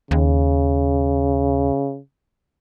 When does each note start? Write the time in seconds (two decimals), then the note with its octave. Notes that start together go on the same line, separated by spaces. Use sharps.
0.11 D#2 C#3